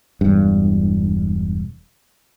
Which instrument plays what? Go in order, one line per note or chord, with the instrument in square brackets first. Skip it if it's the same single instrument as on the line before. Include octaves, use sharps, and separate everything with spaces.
[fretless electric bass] E1 G2